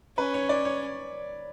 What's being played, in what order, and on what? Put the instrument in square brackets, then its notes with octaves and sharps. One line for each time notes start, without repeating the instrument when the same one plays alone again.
[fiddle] C#4 [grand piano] B4
[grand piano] C#5
D5
C#5